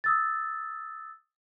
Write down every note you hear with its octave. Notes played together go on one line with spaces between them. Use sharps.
D#6 E6 A6